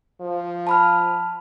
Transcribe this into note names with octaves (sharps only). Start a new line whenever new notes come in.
F3
A5 B5 F6